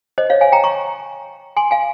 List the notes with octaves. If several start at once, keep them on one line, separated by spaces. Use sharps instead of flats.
C5 D#5
C#5 F5
F5 G#5
G5 A#5
A#5 C#6
G#5 C6
F5 G#5